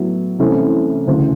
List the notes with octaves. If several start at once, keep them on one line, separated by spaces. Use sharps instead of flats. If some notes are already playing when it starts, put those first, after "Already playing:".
Already playing: A2 F#3 B3 E4
C2 C3 E3 A3 C#4
D2 C#3 E3